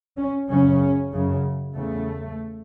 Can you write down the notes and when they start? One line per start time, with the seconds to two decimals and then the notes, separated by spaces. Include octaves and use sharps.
0.18 C#4
0.49 F#2 C#3 C#4
1.12 F#2 C#3
1.75 E2 C#3 A3